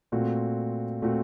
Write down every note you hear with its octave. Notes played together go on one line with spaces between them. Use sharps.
A#2 A3 C4 F#4
A#2 A3 C4 F#4